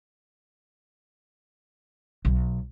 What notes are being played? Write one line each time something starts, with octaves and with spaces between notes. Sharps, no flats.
B1